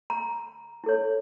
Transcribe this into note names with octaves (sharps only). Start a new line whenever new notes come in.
A#5
E4 A4 C#5